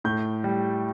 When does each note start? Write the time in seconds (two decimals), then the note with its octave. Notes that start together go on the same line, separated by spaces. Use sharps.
0.04 A2 G6
0.44 G3